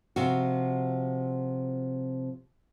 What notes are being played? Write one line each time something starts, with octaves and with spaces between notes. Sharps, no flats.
C3 F3 F#4